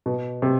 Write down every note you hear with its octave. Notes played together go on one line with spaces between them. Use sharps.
B2
C3